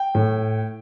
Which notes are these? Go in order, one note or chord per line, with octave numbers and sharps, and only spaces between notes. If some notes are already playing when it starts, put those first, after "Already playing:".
Already playing: G5
A2